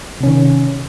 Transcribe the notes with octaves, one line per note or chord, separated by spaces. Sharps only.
C3 D#3 C#4